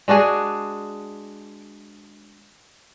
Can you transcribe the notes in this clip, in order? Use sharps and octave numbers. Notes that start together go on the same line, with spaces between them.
G#3 D4 F#4 G#4